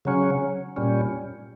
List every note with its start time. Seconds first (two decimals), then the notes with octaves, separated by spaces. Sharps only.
0.05 C#3 F#3 C#4
0.76 A#2 G3 C#4